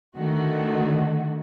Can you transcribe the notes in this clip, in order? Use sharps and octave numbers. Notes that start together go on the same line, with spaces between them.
D3 D#3 A3 F#4